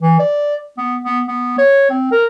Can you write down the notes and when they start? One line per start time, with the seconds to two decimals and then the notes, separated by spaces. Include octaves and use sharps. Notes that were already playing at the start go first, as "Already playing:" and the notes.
0.01 E3
0.19 D5
0.77 B3
1.04 B3
1.28 B3
1.58 C#5
1.90 C4
2.12 A#4